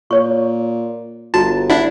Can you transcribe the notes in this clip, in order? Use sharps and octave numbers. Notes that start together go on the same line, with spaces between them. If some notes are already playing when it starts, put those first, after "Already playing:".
A#2 C#5 C#6
G1 F#4 A5 A#5
D4 E4 F#5